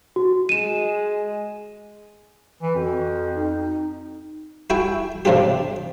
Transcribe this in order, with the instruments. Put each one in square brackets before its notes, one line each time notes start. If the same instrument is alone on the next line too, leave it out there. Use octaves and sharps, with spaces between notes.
[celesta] F#4
[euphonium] G#3 [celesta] D#7 E7
[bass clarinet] E3
[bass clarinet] F2 [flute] F#4
[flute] D#4
[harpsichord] E4 F#4 G5 G#5
C3 F3 D4 F4 G4